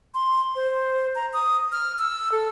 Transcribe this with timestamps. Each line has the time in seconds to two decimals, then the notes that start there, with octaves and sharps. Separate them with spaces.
0.14 C6
0.56 C5
1.15 A#5
1.33 D#6
1.72 F6
1.99 E6
2.32 A4